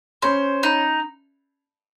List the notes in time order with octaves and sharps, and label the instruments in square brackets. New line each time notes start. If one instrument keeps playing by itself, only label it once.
[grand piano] C#4 [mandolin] C5
[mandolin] D#4